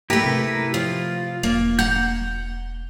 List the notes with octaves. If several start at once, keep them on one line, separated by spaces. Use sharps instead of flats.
A3 A#3 E4 G4 A#4 B4
C3
F3 F4
E1 A#3
F#5 A#5 G6